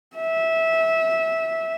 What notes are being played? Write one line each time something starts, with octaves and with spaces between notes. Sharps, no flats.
E5